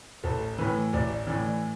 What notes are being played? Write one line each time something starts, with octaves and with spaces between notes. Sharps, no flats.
A1 A4
A2 E3 B4
A1 D5
A2 E3 D5